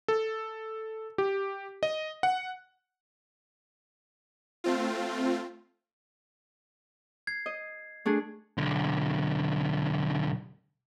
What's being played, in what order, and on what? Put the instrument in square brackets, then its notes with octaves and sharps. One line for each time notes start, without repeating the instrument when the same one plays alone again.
[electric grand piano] A4
G4
D#5
F#5
[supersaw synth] A3 C4 F4
[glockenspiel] G#6 C7
[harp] D#5
A3 D4 G#4
[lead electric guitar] B1 D3